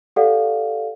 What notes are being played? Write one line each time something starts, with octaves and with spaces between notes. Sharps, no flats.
G4 A4 D5 F5 F#5